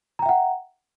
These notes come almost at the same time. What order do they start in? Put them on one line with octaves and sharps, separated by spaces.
A#5 G5 E5 F#5